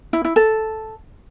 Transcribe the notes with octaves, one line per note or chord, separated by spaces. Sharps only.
E4
E4
A4